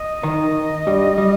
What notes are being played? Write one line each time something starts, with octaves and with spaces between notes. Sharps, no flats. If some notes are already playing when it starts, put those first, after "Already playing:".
Already playing: D#5
D#3 D#4
G2 G3
G3